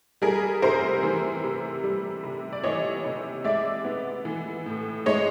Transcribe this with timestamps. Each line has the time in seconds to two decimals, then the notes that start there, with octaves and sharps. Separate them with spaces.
0.22 G3 G#4 A#4
0.62 C3 A#4 C5
1.03 E3
1.44 C3
1.84 G3
2.23 C3
2.53 D5
2.64 E3 C#5 D#5
3.05 C3
3.44 G#3 D5 E5
3.85 B3
4.25 E3
4.66 A2
5.06 G#3 C#5 D#5